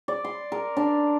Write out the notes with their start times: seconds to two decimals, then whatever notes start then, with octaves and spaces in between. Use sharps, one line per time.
0.08 D5
0.24 C6
0.52 A#4
0.77 D4